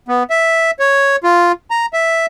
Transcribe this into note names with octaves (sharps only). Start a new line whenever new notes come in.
B3
E5
C#5
F4
A#5
E5